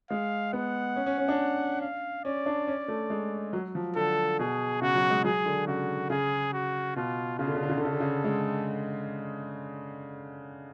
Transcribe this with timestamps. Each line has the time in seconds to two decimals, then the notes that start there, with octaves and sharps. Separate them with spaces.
0.10 G#3 F5
0.53 B3 F#5
0.96 C#4
1.06 C#4
1.18 C#4
1.28 D4
1.81 F5
2.25 C#4 D5
2.46 D4
2.67 C#4
2.88 A3
3.10 G#3
3.53 F#3
3.75 F3
3.96 D3 A4
4.39 B2 G#4
4.82 C#3 F#4
4.95 F#3
5.10 G#3
5.25 F#3 G#4
5.45 D3
5.67 C#3 F#4
6.10 C#3 G#4
6.53 F#4
6.96 B2 F4
7.39 C#3 F4
7.47 D3
7.55 C#3
7.63 D3
7.69 C#3
7.77 D3
7.82 C#3 A4
7.92 D3
8.00 C#3
8.24 G#3